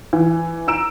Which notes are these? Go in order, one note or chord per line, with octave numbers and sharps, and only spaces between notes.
E3
A#5 E6 D7 E7